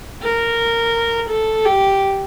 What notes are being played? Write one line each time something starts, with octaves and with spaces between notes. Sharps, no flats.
A#4
A4
G4